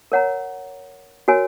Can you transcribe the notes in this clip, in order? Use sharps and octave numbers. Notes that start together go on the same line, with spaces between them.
A#4 C#5 F#5 A#5
F#4 A#4 C#5 G#5